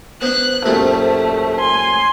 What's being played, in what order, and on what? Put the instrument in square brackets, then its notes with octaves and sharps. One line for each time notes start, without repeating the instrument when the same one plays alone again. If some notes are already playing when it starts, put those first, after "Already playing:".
[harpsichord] B3 D4 [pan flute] C5 [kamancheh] F#6
[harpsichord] F#2 A#2 G3 [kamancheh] A3
[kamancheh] G#5 [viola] C6